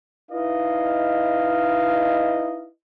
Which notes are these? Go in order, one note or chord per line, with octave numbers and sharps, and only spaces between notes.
D#4 E4 B4 D#5 F5